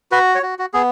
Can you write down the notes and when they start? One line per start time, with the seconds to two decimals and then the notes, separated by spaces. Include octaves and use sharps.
0.12 F#4 B4
0.35 C#5
0.43 F#4
0.59 F#4
0.73 B3 G#4